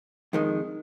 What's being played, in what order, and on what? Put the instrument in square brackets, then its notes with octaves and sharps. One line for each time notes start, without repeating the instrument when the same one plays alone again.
[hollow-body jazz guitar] F2 D#3 G#3